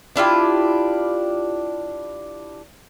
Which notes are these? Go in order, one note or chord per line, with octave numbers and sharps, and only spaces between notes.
D4 E4 F4 G4